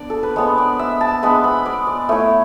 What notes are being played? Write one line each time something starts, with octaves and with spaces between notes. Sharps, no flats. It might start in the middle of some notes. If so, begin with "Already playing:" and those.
Already playing: B3 D4 D5
A4
B4
G#3 B3 D4 C#5
D5
E5
A5
G#3 B3 D4 B5
B5
D5
D5
A3 E4 C#5